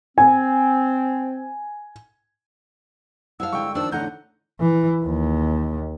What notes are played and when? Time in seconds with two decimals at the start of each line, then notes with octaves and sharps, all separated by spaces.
0.18 C4 G#5
3.40 E4 C5 F5 F#5 A5 E6
3.53 G2 D3 G#3 G5 C#6
3.75 D#3 F3 D4 C5 E6
3.92 E2 A2 D3 D#4 F#5 G6
4.60 E3
5.05 D#2